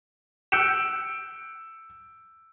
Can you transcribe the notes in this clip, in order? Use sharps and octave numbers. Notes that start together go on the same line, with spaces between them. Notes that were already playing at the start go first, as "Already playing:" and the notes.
E6 F#6 G6 C#7 D7 E7